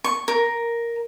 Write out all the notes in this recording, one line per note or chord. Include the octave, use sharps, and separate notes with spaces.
C#6
A#4